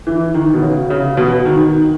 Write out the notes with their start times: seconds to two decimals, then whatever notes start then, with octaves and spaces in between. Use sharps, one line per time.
0.07 E3
0.34 D#3
0.53 B2
0.62 C#3
0.90 C#3
1.17 B2
1.46 D#3